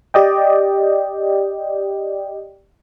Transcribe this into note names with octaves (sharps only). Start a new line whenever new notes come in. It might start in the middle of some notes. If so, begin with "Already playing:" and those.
G4 D5 D#5 G5